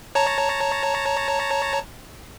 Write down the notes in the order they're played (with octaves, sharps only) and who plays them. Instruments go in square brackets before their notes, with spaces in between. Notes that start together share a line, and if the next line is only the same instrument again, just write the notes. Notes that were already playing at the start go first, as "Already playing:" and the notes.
[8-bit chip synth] C#5 A5 A#5